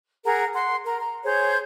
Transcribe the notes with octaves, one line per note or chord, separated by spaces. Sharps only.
G#4 A#4 F#5 A#5
F#5 C6
A#4 A#5
A#5
G#4 C5 C#5 G6